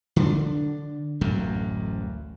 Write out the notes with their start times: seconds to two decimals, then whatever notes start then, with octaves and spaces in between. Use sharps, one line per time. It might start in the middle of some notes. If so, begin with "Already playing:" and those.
0.16 D3 D4
1.21 D1 A1 F#2 F#3